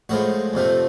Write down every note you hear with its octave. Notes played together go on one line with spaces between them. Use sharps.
A2 F3 G#3 F#4
F2 C3 F3 A3